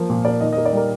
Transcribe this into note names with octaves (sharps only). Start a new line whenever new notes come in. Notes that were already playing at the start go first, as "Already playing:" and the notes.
Already playing: F3 A#3
A#2
A#3 D5
D#3 D#5
D#5
A#3
D5
G3 A#4